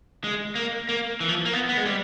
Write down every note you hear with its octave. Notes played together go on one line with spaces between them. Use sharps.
G#3
A#3
A#3
E3
F3
A#3
B3
B3
G#3
G3